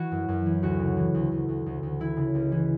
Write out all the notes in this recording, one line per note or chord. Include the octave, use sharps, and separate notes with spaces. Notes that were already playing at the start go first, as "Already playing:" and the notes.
Already playing: E3 F#4
F#2
F#2
E3
D2 F#4
C#3
E3
D2
D2
D2
D2
D2
E3 E4
C#3
C#2
E3